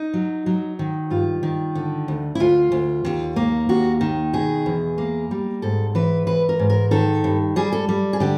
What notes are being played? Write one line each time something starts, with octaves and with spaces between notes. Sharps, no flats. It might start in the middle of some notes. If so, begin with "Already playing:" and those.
Already playing: D#4
F#3
F#3
D#3
G2 F4
D#3
D3
D2
E4
D2 F4
D2
D#2
A#3
D#2 F#4
D#3
B2 G#4
E2
A#3
G3
G#2 A4
E3 B4
E3 B4
A#4
G#2
A#4
D#3 A4
G2
G3 G#4
A4
G3
G#4
D3 G4